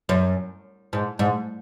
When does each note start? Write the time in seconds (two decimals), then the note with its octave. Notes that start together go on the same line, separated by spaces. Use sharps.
0.09 F#2
0.93 G#2
1.19 G#2